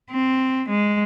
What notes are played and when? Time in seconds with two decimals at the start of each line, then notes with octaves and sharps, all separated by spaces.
0.12 C4
0.69 G#3